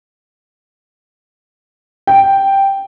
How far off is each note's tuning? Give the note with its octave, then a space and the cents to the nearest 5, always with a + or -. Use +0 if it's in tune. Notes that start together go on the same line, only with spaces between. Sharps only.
G5 +0